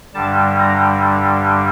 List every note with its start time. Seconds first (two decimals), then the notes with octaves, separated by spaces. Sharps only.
0.14 G2 D3 G3 A5
0.59 A#5